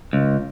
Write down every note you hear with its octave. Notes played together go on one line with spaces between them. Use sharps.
C#2